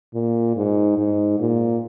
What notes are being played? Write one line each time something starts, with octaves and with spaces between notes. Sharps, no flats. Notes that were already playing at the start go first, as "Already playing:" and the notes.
A#2
G#2
G#2
A#2